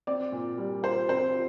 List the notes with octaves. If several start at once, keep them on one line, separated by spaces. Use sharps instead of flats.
C4 D5
A#2
G3
F4 C5
C4 C5